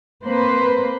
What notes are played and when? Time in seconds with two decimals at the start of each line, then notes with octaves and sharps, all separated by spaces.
0.24 A#3 C4 B4 C5